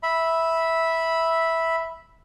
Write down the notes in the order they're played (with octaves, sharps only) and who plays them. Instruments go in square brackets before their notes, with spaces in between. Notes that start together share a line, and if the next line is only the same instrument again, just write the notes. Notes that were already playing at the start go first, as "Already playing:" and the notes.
[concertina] E5 B5